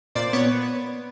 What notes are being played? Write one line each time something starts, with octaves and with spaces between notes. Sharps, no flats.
A#2 C5 D5
B3 B4 C#5